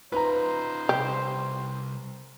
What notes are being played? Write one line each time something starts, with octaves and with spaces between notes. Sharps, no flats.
D#4 F4 B4 C5 A#5
C2 G4